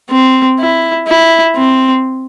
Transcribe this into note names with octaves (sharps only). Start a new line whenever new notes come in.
C4
E4
E4
C4